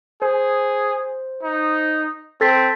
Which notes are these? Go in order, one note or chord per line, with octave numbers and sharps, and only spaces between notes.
G#4 C5
D#4
C4 A4 A6 B6